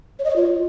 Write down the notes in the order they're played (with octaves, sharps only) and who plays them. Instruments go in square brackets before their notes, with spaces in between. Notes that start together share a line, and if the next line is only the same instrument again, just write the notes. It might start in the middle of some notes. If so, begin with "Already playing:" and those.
[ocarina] C#5
D#5
C#5
F4